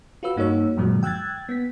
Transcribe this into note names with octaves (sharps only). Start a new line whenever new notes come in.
F4 F#4 B4 E6
G2 A#3 D#4 F#4 C#5 E6
F#2 A#2 D3 F3 F#3 G#3
G5 E6 F#6 G#6 A6
B3 B6